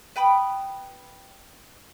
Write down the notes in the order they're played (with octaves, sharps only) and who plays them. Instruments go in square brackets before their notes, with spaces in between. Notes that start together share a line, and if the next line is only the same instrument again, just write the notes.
[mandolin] B4 G5 B5 D#6